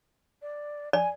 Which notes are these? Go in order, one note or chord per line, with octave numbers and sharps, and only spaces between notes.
D5
D5 G#5